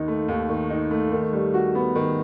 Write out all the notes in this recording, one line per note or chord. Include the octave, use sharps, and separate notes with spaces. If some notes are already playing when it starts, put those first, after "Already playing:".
Already playing: D#2 D#3 D#4
A3
D#2
D#3
D#4
A3
D#3
G3
F#4
B3
D#3